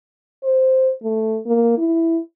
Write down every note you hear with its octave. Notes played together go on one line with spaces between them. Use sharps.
C5
A3
A#3
E4